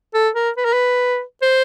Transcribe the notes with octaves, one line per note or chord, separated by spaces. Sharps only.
A4
A#4
B4
A#4
B4
C5